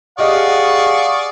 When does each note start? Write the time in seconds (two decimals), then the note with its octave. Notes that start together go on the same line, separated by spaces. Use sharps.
0.19 G4 G#4 D5 D#5 F5 F#5 C#6 D#6